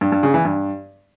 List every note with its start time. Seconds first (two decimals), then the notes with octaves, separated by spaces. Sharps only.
0.01 G2
0.12 G2
0.23 C#3
0.34 E3
0.45 G2